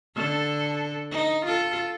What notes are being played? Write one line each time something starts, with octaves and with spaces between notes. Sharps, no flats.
D3 A4
D#4
F4 A4